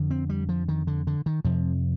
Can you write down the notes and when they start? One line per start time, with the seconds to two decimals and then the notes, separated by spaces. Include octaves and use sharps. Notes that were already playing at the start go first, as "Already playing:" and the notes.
Already playing: F2 D3
0.11 C4
0.29 G3
0.49 F3
0.68 D#3
0.87 D3
1.07 D3
1.26 D#3
1.45 F2 C3 F3